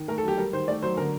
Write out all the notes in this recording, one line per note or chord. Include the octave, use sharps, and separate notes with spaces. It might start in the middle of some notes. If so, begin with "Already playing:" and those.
Already playing: D#3
A3 A#4
A4
F#3 G4
G3 A#4
D#3 C5
A3 D5
F#3 C5
D3 A#4